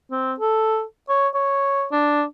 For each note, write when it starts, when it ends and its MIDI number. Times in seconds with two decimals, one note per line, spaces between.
0.11 0.34 60
0.40 0.83 69
1.09 1.28 73
1.34 1.86 73
1.92 2.24 62